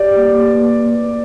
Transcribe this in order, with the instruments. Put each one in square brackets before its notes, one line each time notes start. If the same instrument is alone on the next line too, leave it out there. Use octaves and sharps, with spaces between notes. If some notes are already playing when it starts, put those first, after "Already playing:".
Already playing: [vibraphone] G4 [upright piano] D5
[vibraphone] A#3
B4